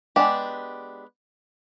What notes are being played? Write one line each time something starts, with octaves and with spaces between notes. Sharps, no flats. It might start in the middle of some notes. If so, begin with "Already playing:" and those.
G#3 B3 D4 G4